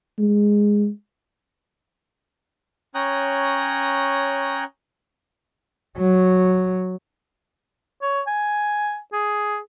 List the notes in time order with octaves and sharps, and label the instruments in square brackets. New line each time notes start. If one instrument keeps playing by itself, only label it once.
[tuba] G#3
[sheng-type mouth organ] C#4 C#5 G5 A#5 D#6 F#6
[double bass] F#3
[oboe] C#5
G#5
G#4